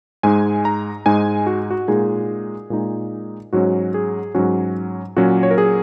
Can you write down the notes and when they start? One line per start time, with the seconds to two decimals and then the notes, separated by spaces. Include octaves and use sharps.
0.23 G#2 G#3 D#4 G#5
0.65 A#5
1.06 G#2 G#3 D#4 G#5
1.47 F#4
1.71 F#4
1.88 A#2 G#3 D#4 G#4
2.70 A#2 G#3 D#4
3.53 G#2 F#3 C#4 F#4
3.94 G#4
4.34 G#2 F#3 C#4 F#4
5.17 A#2 F#3 C#4 F#4
5.43 C#5
5.51 A#4
5.58 G#4